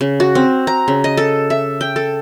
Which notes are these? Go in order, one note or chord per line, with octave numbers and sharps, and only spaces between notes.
C#3
F#4
C4
A#5
C#3
D#5
A4
E5
G5
A4